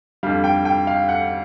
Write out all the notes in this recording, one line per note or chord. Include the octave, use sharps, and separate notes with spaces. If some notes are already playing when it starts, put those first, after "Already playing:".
F2 D3 G3 F5
G5
G5
F5
F#5